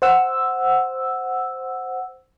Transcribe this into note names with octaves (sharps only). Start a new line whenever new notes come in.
C5 F#5 E6